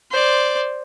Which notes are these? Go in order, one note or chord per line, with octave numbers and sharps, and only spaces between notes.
C5 D5